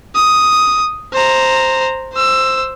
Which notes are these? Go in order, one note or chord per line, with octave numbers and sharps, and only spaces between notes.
D#6
C5 A#5
C5 E6